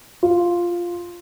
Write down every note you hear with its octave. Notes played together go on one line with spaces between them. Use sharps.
F4